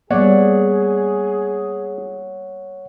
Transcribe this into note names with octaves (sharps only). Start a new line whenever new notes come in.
G3 A#3 B3 G#4 C#5 D5 F#5